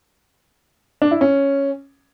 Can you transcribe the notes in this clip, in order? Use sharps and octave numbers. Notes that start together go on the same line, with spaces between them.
D4
E4
C#4